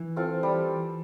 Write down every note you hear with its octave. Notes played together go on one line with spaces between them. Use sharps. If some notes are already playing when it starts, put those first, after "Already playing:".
Already playing: E3
C4 F4 A4
G3